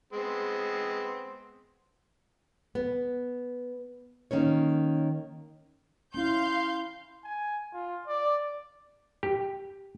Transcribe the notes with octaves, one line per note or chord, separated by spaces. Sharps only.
G#3 B3 C4
B3
D#3 A#3 C#4 C#5
C#4 E4 F5 C6 G6
G#5
F4
D5
G4